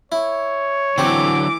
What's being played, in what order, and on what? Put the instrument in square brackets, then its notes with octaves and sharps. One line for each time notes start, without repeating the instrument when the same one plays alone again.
[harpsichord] E4 [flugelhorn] C#5
[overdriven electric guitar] D3 F#3 [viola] E3 D6 [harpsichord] C4 G4